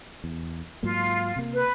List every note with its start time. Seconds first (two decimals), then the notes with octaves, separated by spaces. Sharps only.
0.24 E2
0.83 G#2 F#3 A#3 F4
1.36 C3 A#3
1.53 B4